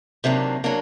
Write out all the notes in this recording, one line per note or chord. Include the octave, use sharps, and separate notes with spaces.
C3 D#3 F#3 A#3 D4
F#3 A#3 D4